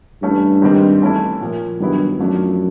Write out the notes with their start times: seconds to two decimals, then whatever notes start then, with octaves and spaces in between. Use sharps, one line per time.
0.23 G2 E3 A3 C#4
0.62 G#2 D#3 G3 C4 D#4
1.02 E3 A3 C#4 E4 A4
1.41 A#2 F3 A#3
1.79 G2 D#3 F#3 B3 E4
2.19 F#2 F3 A3 D4